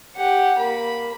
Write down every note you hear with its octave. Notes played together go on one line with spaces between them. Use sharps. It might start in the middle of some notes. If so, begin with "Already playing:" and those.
G4 F#5
A#3 B5